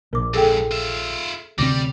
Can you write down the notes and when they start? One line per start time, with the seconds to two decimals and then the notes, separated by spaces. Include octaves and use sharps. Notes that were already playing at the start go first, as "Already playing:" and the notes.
0.13 A#1 A#4 D6
0.34 F2 G#2 G#4 A4 G5
0.71 F4 E5
1.58 D2 C3 G3 C4 D6 A#6